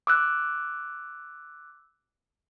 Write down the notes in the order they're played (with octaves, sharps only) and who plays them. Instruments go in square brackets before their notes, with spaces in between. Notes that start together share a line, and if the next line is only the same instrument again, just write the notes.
[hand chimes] D6 E6 F#6